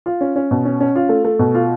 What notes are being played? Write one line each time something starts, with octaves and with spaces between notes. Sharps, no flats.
F4
C#4
C#4
B2
C#4
C#4
F4
A3
A3
B2
F4